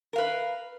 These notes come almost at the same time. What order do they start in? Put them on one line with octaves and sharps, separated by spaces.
A#4 F5 B4